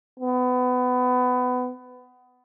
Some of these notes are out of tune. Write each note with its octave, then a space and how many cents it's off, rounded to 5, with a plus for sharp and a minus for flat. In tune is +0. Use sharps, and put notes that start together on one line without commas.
B3 +25